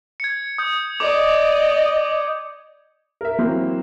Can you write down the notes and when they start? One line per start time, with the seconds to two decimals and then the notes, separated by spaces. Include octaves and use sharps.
0.20 G#6 C#7
0.58 D#6 G6
1.00 D5 D#5 D6
3.21 A#4 E5
3.38 E3 F#3 A#3 C4